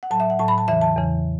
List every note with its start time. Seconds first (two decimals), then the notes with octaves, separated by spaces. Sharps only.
0.03 F#5
0.11 A2 F#3 A5
0.20 E5
0.30 F#5
0.39 A2 F#3 A5
0.48 B5
0.58 A5
0.67 E2 C#3 E3 E5
0.82 A5
0.97 E2 C#3 E3